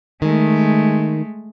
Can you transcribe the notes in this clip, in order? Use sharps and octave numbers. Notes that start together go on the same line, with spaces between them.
D#3 G#3 A3